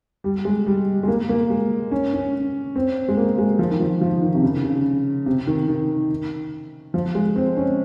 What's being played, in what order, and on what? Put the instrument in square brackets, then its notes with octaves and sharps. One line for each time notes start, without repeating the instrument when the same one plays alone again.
[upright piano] G3
G#3
G3
G#3
A#3
A#3
G#3
C#4
C#4
C4
G#3
A#3
G#3
F3
D#3
F3
F3
D#3
C3
C#3
C#3
C3
D#3
D#3
F3
G#3
C4
C#4